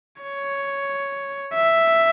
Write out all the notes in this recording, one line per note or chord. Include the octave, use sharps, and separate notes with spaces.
C#5
E5